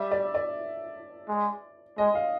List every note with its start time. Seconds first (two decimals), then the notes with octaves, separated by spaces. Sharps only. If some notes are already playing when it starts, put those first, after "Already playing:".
Already playing: G3 E5
0.11 D5
0.35 D5
1.28 G#3
1.98 G#3 D#5
2.15 F5